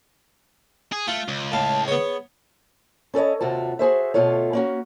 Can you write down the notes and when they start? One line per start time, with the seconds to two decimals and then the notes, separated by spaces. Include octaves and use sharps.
0.92 G#4
1.08 A3 F4
1.28 C#2
1.52 A2 F5 A5
1.88 B3 G#4 C#5
3.14 C#4 A4 A#4 C#5 D#5
3.41 D#2 C3 F4 F#4 A5
3.79 F#4 G#4 C5 E5
4.14 D2 B2 A3 F4 A4 C#5
4.53 A#3 C#4 F#4